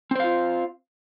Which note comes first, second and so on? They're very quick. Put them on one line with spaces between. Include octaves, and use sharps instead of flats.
C4 C5 F5 F4